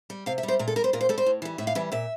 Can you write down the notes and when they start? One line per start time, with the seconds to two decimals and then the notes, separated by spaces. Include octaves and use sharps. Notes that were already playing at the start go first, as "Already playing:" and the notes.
0.10 G3
0.26 C3 F5
0.38 E5
0.43 G3
0.48 C5
0.59 A#2 A#4
0.68 A4
0.76 G3 A#4
0.84 C5
0.93 A#2 A#4
1.01 C5
1.09 G3 A4
1.18 C5
1.26 A2
1.42 E3 G3
1.58 A2 E5
1.67 F5
1.75 E3 G3 E5
1.92 A#2 E5